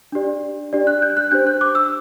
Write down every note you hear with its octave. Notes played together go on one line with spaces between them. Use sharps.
D4 G4 D5
D4 G4 D5
F#6
G6
F#6
D4 G4 C5 G6
F#6
D6
E6